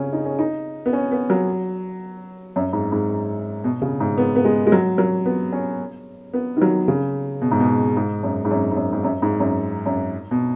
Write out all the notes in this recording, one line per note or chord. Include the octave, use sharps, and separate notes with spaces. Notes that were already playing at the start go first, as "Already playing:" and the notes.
Already playing: C#3 C#4
D#4
C#4
D#4
B3
C#4
B3
F#3
F#2
G#2
G#2
B2
C#3
G#2
B3
B3
G#3
G#3
F#3
F#3
B3
C#4
B3
D#3
F#3
C#3
B2
G#2
B2
G#2
F#2
G#2
F#2
G#2
F#2
G#2
F#2
G#2
F#2
F#2
B2